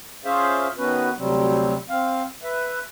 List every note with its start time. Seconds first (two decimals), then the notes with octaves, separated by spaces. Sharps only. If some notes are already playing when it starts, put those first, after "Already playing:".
0.25 C#4 F4 G#4 C5 E5 F5
0.78 D#3 B3 C#4 F#4 B4
1.18 D2 C3 F#3 G3 C4
1.89 C4 F5
2.43 B4 E5